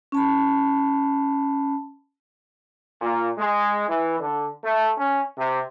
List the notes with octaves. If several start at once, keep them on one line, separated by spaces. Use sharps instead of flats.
C#4 A5 B5
A#2
G#3
E3
D3
A3
C#4
C3